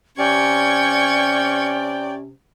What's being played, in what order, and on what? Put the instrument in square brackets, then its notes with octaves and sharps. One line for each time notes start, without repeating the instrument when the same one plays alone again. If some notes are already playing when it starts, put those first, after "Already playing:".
[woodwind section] C3 C#4 [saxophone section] C#5 D5 [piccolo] G5 [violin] C#6 G#6